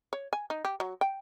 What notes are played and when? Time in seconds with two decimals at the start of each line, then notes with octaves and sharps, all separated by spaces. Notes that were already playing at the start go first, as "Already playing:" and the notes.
0.13 C#5
0.33 G#5
0.50 D#4
0.65 G4
0.80 F#3
1.01 G5